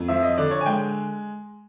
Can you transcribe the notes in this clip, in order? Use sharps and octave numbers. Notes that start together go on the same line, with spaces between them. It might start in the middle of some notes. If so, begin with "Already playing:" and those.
Already playing: F2
F3 E5
D#5
D3 D5
C#5
G#5
G#3 G5